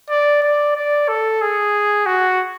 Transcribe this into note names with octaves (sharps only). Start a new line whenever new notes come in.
D5
D5
D5
A4
G#4
F#4